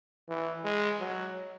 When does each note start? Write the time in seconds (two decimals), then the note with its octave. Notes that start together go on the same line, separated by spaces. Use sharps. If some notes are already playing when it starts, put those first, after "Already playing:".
0.29 E3
0.64 G#3
1.00 F#3